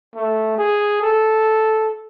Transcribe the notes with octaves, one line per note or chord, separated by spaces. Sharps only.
A3
G#4
A4